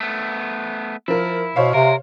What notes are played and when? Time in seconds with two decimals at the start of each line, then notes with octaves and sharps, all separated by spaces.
0.01 A3 B3
1.08 F3 E4 A#4
1.56 B2 C5 C#5 F5
1.74 C3 A#4